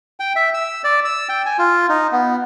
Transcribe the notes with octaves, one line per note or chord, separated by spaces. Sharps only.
G5
E5
E6
D5
E6
G5
G#5
F4
D#4
B3